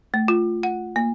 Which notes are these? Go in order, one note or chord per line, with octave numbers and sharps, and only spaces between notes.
A3
F4
F#5
A#3